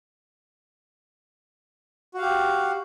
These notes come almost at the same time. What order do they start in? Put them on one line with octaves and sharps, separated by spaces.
F#4 F5 G4